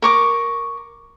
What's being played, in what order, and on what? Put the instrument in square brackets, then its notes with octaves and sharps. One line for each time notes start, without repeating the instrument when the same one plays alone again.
[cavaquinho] A#4 C#6 D6